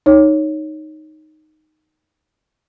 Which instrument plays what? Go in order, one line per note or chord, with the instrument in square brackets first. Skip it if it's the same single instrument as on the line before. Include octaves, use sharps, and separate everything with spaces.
[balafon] D#4 C#5